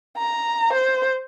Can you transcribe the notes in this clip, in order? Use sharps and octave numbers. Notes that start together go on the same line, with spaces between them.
A#5
C5